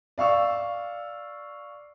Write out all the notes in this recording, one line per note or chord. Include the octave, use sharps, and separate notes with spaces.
D5 F5 C#6 E6